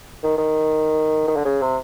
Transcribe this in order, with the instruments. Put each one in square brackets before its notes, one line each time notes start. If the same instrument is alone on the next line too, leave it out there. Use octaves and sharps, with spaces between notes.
[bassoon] D#3
D#3
D#3
D3
C#3
C3